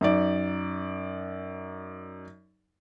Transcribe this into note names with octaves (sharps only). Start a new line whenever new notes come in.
F#2 D#4 D5